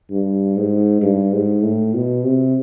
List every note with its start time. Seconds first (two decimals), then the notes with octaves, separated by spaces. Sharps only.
0.11 G2
0.57 G#2
1.02 G2
1.32 G#2
1.63 A2
1.94 B2
2.24 C3